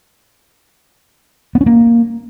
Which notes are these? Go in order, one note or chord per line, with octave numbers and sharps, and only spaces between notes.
B3
C#4
A#3